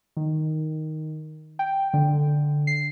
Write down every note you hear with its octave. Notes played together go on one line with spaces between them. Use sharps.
D#3
G5
D3
C7